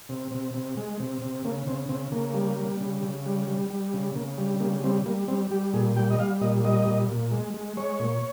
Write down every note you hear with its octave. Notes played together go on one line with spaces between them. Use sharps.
C3
C3
C3
G#3
C3
C3
C#3 A#3
C#3 C4
C#3 C4
C#3 A#3
G3
G3
C#3
C#3
G3
G3
G3
C#3
C#3 A#3
G3
C#3 A#3
G3 C4
G3 A#3
G3 C4
G3 G4
A#2 G#4
G3 G5
D#5
G3 F5
A#2 D#5
G3 D#5
A#2
A#2
G#3
G#3
G#3 C#5
A#2